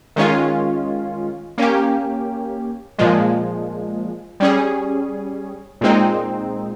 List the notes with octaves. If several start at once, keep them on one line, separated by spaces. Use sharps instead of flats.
D#3 G#3 C#4 F4
A#3 C#4 G4
A#2 F3 G#3
G3 C#4 G#4
A#2 G#3 C4 D#4